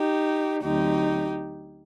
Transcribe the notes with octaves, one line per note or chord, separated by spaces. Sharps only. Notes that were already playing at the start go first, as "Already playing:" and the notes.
Already playing: D#4 G4
D2 D3 F#3 C4 D#4 G4